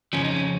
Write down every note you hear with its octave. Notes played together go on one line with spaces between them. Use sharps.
F2 C#3 F3 C#4
D#4
C#4